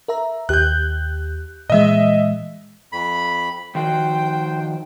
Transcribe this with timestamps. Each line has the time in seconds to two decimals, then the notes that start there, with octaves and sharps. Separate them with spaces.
0.08 A#4 E5 A#5
0.49 D#2 G4 F#6 G6
1.70 A#2 E3 G#3 D#5 E5
2.92 F2 B5
3.75 D#3 F3 F#4 C5 G5